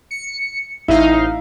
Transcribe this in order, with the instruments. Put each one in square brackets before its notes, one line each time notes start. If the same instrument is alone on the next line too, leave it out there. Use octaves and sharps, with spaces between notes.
[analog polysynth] C#7
[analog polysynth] A1 D#4 F5 [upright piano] E4